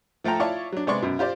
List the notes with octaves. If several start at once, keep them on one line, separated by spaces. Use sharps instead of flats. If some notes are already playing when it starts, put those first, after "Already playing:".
F3 A3 A4 G5 A#5
E4 F4 C#5 D5 A5 C#6
F#3 D4
C3 G#3 B3 D5 C6 C#6
F#2 B2
F4 G4 C5 D5